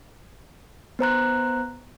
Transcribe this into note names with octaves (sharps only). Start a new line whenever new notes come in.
B3 C5 A#5 F#6